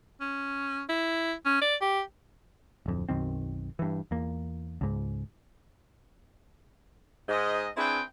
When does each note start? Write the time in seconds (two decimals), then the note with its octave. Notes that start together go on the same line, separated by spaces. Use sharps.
0.21 C#4
0.89 E4
1.46 C#4
1.61 D5
1.81 G4
2.86 D1 F2
3.09 B1 F#2 D#3 C4
3.79 G2 E3
4.11 E2 A#3
4.81 C#2 G#2
7.29 G#2 D#5
7.76 C4 D4 E4 G#4 B4 G5